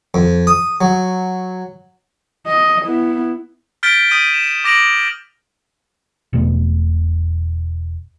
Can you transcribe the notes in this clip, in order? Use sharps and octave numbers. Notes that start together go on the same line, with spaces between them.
F2
D#6
F#3
D#5
B3 E4
F6 G6 A6 B6 D7 G7
D#6 G6 B6 D#7
E7
D6 A#6 D7 F7 F#7
E1 B2 A3 B3